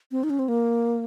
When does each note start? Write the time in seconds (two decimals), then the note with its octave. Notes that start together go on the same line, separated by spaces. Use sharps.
0.11 C4
0.24 D#4
0.30 C#4
0.39 C4
0.48 A#3